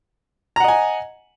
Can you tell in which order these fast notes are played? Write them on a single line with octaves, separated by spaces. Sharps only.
A#5 F#5 D#5 G#5